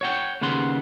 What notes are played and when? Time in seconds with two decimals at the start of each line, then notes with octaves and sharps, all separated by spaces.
0.01 C#5 F#5 G5
0.41 D#2 C#3 B3 F#5 C6